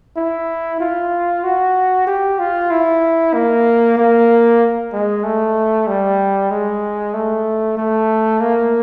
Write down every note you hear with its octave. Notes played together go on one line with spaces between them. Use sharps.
E4
F4
F#4
G4
F4
E4
A#3
A#3
G#3
A3
G3
G#3
A3
A3
A#3